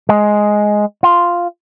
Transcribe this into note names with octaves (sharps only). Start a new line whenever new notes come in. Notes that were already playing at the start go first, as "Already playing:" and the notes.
G#3
F4